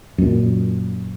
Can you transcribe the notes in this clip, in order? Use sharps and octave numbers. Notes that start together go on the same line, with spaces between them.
F#2 A#2